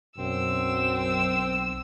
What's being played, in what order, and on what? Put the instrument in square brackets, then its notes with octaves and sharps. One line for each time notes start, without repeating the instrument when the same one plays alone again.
[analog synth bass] B1 [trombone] F#2 [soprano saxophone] C4 [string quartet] E6